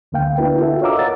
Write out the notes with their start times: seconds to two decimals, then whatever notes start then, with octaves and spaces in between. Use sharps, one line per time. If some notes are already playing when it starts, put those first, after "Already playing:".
0.12 D2 D3 A#3 F5 G5
0.38 B3 D4 E4 F#4 A#4 B4
0.59 F4 F#4 A4 E5
0.82 C#5 D#5 F5 A#5 D6 E6
0.96 A#4 F#5 A6